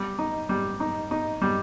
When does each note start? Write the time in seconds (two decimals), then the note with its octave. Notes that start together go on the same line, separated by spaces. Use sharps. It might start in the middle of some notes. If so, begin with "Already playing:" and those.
Already playing: G3
0.19 D#4
0.49 G3
0.80 D#4
1.11 D#4
1.42 G3